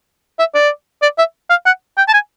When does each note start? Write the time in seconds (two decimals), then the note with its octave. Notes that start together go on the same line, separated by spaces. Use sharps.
0.39 E5
0.55 D5
1.02 D5
1.18 E5
1.50 F5
1.66 F#5
1.98 G5
2.08 A5
2.14 G#5